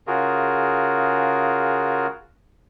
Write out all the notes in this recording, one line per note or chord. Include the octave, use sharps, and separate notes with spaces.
C#3 F4 F#4 G#4 A#4